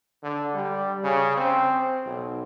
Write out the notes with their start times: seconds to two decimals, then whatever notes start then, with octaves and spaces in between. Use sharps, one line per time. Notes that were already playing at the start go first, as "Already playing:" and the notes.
0.23 D3
0.54 G3
1.03 C#3
1.37 C4
2.06 B1